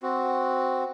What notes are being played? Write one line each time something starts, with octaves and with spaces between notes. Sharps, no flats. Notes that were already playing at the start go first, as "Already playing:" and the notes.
C4 F#4